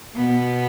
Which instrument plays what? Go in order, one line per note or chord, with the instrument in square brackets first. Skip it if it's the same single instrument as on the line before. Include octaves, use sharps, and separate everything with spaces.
[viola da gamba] B2 B3